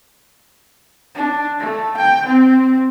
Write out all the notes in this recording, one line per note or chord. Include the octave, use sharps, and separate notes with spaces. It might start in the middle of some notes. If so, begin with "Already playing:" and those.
D4
A3
G5
C4